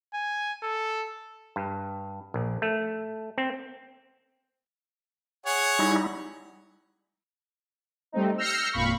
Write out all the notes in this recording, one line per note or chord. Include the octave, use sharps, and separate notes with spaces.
G#5
A4
G2
A#1
A3
C4
G#4 C#5 F#5
G3 D#4 E4
G3 A3 C4 D#4
E6 F6 G6 A#6 C7 C#7
G#1 F2 A#2 F5 B5 C#6